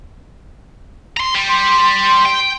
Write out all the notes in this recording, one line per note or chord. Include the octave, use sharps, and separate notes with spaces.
A#5 C6
G3
C6
G5